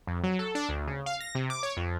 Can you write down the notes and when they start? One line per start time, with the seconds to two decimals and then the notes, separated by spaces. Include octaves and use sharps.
0.07 F2
0.23 F#3
0.39 A4
0.55 D4
0.69 D2
0.87 C#3
1.06 F5
1.20 A#6
1.35 C3
1.50 D6
1.63 C#5
1.77 F2